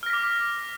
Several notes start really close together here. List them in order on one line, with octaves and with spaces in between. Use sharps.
F6 A#6 B6 D6